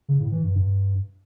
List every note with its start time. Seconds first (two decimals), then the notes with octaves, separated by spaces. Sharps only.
0.08 C#3
0.20 A2
0.32 E3
0.44 G2
0.55 G2